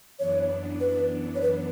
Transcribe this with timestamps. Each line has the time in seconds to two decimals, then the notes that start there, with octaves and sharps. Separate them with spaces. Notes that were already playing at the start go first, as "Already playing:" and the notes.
0.18 F#2 E3 B3 D4 C#5
0.81 B4
1.35 C#5
1.42 B4